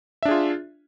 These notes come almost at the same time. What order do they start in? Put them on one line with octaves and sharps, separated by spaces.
E5 D4 G#4 F4